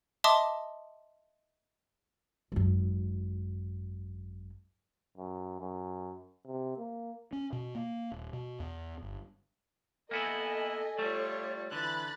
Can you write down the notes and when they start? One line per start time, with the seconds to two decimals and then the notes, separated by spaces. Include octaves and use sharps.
0.24 D#5 E5 A5 C6 D6 D#6
2.52 G#1 F#2
5.17 F#2
5.60 F#2
6.46 C3
6.78 A#3
7.33 C#4
7.52 B2
7.75 A#3
8.11 D#1
8.33 B2
8.60 E2
9.02 G1
10.11 A#3 B3 E4 A4 D#5 G#5
10.98 G3 A3 F4 C#5 D5
11.72 D3 E3 B5 F#6 A6